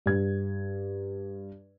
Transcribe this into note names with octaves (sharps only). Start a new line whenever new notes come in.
G2 G3 G#6